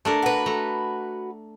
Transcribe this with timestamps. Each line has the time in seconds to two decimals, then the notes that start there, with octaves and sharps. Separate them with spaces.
0.05 A3 D4 A#4
0.23 F#4 B4
0.46 A3 A#5